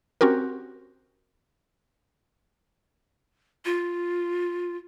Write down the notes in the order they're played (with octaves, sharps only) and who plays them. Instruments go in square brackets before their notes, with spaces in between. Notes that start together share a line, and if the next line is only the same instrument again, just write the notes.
[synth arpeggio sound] C4 C#4 F#4 G4 A#4
[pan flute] F4